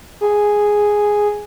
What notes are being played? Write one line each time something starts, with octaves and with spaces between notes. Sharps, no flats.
G#4